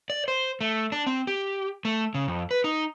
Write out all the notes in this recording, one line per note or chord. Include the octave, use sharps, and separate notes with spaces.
D5
C5
A3
D4
C4
G4
A3
C#3
F2
B4
D#4